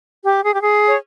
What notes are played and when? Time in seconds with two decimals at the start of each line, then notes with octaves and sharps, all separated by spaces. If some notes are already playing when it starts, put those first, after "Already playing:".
0.23 G4
0.42 G#4
0.54 G4
0.60 G#4
0.87 C#5